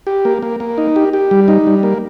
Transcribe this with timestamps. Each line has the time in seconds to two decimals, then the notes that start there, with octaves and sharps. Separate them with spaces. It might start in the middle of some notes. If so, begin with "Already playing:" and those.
0.07 G4
0.25 A#3
0.42 A#3
0.60 A#3
0.78 D#4
0.96 G4
1.13 G4
1.31 G3
1.48 D#4
1.67 G3
1.83 A#3